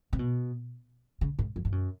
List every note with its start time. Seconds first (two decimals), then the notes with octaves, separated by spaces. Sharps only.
0.13 C3
0.19 B2
1.21 C#3
1.39 G#2
1.56 F2
1.65 G2
1.72 F#2